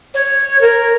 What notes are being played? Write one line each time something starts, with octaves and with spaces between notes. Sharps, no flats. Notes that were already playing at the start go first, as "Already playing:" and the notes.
C#5
A#4